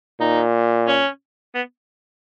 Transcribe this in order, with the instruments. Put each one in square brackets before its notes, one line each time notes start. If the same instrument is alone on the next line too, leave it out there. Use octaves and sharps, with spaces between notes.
[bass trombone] A#2 [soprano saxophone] D#4
[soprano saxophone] C#4
B3